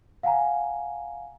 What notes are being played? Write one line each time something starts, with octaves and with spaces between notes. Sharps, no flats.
F5 F#5 G#5 A#5